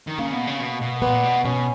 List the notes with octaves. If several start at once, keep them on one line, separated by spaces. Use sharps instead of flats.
D#3
C#3 A#3
B2
C#3
B2
B2
A#2 B3
B2
B2 C#4